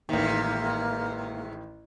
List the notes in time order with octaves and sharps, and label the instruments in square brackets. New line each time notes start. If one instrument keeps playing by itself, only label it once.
[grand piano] A1 D#3 [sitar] G#2 C3 [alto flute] A#3